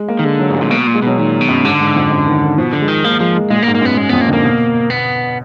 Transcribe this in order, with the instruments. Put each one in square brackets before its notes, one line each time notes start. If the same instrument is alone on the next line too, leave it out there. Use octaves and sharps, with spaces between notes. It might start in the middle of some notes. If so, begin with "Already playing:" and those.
Already playing: [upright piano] G#3
A#3
[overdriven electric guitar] D#3
[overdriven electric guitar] D3 [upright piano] G#3
[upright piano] F#3
[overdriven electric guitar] G#2 [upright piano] G#3
[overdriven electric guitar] A#2
[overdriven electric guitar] B2 [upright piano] A#3
[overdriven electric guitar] A#2
[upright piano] G#3
[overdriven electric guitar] B2 [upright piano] F#3
[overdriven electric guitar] A#2 [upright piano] D#3
[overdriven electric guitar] B2
[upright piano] F#2
[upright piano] G#2 [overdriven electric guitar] D3
[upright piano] G#2
F2
F#2
D#3
D#3
[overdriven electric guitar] B2 [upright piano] F3
[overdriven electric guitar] D3
[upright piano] G#3
[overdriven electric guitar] D#3
[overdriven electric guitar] F3 [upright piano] A#3
[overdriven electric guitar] F3 [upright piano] G#3
[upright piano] G#3
[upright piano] A#2 [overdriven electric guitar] G#3
[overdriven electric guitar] A#3
[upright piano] G#2
[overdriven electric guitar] A#3
[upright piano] F#2
[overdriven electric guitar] B3
[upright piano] F#2 [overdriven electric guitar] G#3
[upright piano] F2 [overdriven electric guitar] B3
[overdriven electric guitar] A#3
[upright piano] D3
[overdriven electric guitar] A#3
[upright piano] B2
[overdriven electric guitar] B3